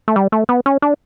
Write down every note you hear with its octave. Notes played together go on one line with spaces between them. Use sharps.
A3
G3
A3
B3
C#4
D4